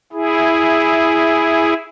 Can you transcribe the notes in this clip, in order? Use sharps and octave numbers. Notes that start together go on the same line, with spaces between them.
E4 G#4